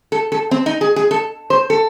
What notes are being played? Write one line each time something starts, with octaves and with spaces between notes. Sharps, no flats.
A4
A4
C4
D#4
G#4
G#4
A4
C5
A4